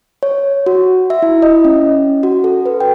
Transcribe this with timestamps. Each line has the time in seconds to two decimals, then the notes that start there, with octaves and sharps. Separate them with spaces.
0.23 C#5
0.66 F#4
1.10 E5
1.22 E4
1.42 D#5
1.65 C#4
2.23 F#4
2.44 A4
2.66 B4
2.80 G5